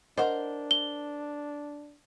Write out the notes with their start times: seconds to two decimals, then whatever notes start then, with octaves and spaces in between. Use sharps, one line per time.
0.18 D4 A#4 C5 D#5 F#5
0.71 G7